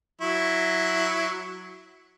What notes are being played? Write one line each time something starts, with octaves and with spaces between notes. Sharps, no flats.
F#3 E4 C#6